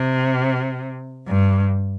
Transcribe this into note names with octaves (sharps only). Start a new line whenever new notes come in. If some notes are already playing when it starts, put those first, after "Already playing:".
Already playing: C3
G2